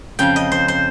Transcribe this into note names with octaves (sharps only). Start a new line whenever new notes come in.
F2 C#3 F3 G5
D#5
C5
C5